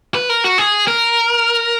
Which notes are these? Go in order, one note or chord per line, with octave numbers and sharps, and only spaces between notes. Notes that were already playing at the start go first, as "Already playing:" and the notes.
B4
A#4
F#4
G#4
A#4